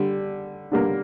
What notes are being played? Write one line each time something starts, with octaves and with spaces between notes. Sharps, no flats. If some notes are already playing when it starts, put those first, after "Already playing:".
Already playing: D3 G3
D3 G3 A#3